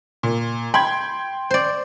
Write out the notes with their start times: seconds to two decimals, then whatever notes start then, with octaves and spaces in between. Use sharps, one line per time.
0.23 A#2
0.74 G5 B5 C6 G#6
1.51 C5 D5